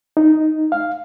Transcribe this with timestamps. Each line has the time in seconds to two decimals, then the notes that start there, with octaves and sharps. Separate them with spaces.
0.17 D#4
0.72 F5